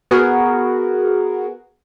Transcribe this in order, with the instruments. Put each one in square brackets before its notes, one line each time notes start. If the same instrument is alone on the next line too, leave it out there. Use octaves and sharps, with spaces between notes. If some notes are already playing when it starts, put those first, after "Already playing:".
[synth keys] B3 F#4 G#4 A#4